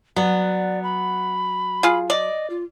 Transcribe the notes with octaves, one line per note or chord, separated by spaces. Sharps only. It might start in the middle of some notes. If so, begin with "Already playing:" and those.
F#3 B3 D5
B5
F4 G#4
D5 D#5
F4